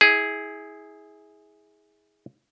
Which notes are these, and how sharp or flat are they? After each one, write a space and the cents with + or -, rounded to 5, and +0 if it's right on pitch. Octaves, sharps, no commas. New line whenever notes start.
E4 -30 G#4 +0